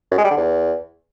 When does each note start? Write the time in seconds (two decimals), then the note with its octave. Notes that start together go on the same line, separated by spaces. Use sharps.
0.12 F#2
0.18 G#3
0.24 G3
0.31 D3
0.37 E2